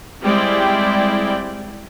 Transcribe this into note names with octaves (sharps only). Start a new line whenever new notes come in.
G3 G#3 C4 E4 D5 G5